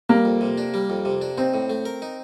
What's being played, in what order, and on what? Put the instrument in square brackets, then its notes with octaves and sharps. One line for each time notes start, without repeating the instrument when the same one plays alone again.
[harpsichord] G3 [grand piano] A#3
[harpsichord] F2
C3
D4
G3
F2
C3
D4
[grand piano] C4 [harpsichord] D#4
[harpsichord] A2
A3
A#4
D#4